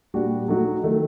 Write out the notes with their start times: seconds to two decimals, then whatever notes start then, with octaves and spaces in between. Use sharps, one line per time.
0.14 A#2 G3 D4 F#4
0.48 F#3 A3 D#4 F#4
0.84 D#3 A3